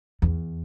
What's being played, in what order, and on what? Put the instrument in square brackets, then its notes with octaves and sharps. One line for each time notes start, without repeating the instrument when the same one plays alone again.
[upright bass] E2